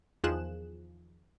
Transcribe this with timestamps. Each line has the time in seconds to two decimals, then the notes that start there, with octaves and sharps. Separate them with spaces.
0.24 E2 D#3 F3 G#4 F#6 E7